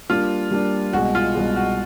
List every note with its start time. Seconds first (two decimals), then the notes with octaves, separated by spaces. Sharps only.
0.09 G3 A#3 D4 F4
0.51 G3 A#3 D4
0.93 C2 B2 G#3 F#4
1.15 F4
1.35 C2 B2 G#3
1.56 F#4